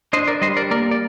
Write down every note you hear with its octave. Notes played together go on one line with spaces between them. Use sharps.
D4 C5 D#5
A#4 D5
G3 C5 D#5
A#4 D5
A#3 A#4 D5
D5